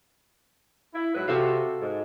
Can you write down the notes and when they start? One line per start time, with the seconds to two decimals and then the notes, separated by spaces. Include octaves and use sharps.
0.94 E4
1.15 G#2 F#3 B4
1.28 C3 F#4 A4 F5
1.81 G#2